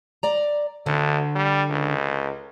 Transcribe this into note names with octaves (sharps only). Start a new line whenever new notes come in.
D5 A#5
D2 D3
G3
C#2